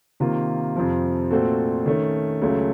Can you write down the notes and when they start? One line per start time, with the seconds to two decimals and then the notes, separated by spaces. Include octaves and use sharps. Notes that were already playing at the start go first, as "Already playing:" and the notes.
0.20 C3 D#3 A#3 F4
0.76 F2 C3 F3
1.31 A#2 A3 C4 F#4 A4
1.86 D#3 A3 C#4
2.42 C#2 C#3 F#3 A3